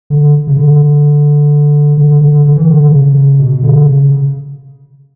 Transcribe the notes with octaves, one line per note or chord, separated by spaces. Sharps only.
D3
C#3
D3
D3
D3
D3
E3
D3
C#3
B2
D3
C#3